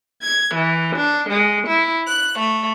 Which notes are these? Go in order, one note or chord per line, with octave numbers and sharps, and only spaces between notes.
G#6
E3
D4
G#3
E4
F#6
A3